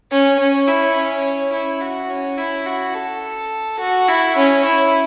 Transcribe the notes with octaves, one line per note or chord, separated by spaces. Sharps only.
C#4
C#4
E4
C#4
E4
F#4
C#4
E4
F#4
A4
F#4
E4
C#4
E4